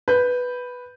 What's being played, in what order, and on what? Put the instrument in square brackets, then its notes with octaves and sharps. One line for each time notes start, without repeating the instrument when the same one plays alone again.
[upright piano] B4 G6